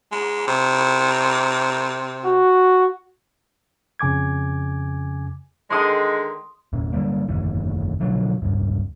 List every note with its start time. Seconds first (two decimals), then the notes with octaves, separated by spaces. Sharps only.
0.12 G#3
0.47 C3
2.25 F#4
3.99 F2 C#3 G#5 D6 G#6
5.70 D3 D#3 G#3 C6 D#6
6.73 E2 A#2
6.93 D3 D#3 G3 A#3
7.28 F#1 E2 A2 D#3
8.00 B2 D3 F3 F#3
8.42 D1 G2